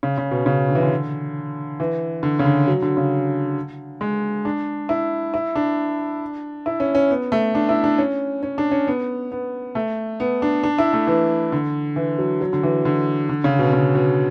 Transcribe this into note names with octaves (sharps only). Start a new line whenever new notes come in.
C#3
C#3
B2
C#3
D3
E3
D3
E3
D3
C#3
D3
F#3
D3
C#3
G#3
D4
E4
E4
D4
E4
C#4
C#4
B3
A3
D4
E4
D4
C#4
C#4
D4
C#4
B3
B3
A3
B3
D4
D4
E4
A3
E3
D3
E3
F#3
F#3
D3
E3
D3
D3
C#3
B2
C#3
B2